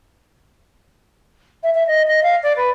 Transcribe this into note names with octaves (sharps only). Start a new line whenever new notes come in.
E5
E5
D#5
D#5
F5
D5
B4